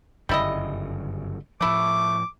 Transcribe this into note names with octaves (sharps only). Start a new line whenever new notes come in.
G1 F#2 C#3 G3 E4 D#5
A2 F3 A3 E4 D6